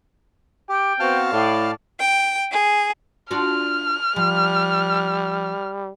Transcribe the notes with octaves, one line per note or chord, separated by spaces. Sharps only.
G4 G5
B3 C4 F#4 F5 A5 F6
A2 D5
G5
G#4
D4 F4 F#4 F6
F3 G3